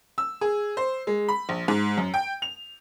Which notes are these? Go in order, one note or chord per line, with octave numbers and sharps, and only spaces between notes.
E6
G#4
C5
G#3
B5
A#1
G#2
F#2
G5
F7